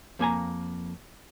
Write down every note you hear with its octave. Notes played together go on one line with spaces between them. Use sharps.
F2 A#3 G#5 A#5